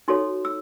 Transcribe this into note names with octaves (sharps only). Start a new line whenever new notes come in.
D#4 F#4 A4 C#5 C6
E6